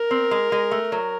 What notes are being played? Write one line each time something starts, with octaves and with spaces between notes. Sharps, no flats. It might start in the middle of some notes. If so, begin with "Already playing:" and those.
Already playing: A#4
C4
G#3
G#3
A3
F#3